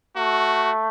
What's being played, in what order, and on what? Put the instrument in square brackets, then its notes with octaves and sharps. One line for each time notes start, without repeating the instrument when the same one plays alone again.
[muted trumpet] A3 [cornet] F#4